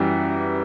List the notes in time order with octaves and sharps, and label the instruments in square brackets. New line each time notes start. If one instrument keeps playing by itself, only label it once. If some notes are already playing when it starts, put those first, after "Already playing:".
Already playing: [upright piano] F#2 E3 G3